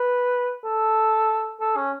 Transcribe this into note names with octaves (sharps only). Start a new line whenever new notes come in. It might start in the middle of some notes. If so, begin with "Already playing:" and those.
Already playing: B4
A4
A4
C#4